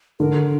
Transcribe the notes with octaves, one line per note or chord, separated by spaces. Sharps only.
D3 A#4